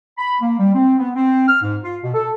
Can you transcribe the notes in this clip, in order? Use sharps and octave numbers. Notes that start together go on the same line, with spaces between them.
B5
A#3
G3
C4
B3
C4
F6
G#2
F4
B2
A4